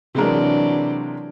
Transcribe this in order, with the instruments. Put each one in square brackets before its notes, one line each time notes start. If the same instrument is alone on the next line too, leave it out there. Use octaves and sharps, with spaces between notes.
[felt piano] C3 G#3 A#4 [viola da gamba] E3 F#3 D4